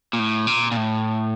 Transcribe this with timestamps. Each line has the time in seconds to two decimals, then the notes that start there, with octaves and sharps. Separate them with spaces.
0.13 A#2
0.19 A2
0.47 A#2
0.72 A#2
0.77 A2